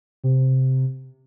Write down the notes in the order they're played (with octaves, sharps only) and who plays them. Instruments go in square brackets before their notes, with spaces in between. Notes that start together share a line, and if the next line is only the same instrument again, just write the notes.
[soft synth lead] C3